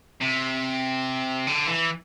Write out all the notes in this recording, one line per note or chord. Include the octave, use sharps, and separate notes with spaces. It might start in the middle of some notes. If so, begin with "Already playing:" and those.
C3
D3
E3